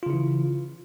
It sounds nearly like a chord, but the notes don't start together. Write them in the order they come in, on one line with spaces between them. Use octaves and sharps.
F4 C#3 E4 E3